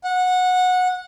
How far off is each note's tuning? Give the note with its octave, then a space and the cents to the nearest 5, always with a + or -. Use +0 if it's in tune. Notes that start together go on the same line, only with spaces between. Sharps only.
F#5 -20